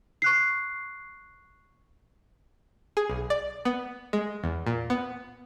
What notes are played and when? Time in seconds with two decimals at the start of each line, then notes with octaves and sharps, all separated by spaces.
0.22 C#6 F#6 C7
2.97 G#4
3.10 B1
3.30 D5
3.65 B3
4.13 G#3
4.43 E2
4.67 A#2
4.90 B3